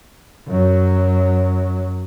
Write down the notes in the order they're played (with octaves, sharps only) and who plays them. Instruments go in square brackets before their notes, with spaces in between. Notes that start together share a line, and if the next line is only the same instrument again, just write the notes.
[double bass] F#2 F#3